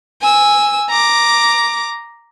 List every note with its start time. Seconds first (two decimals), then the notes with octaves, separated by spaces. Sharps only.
0.21 G#5 E6
0.89 A#5 D6